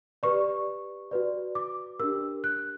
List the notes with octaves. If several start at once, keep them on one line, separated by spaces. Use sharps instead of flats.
G4 B4 D5 C#6
F#4 B4 D5
D6
D4 G4 A#4 E6
F#6